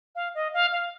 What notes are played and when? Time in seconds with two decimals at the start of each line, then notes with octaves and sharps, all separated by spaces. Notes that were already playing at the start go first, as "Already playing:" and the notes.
0.15 F5
0.35 D#5
0.53 F5
0.72 F5